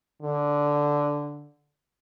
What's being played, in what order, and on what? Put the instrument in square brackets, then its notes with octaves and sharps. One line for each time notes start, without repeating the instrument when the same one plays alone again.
[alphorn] D3